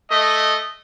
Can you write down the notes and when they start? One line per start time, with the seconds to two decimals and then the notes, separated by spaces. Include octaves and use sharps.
0.10 A3 D#5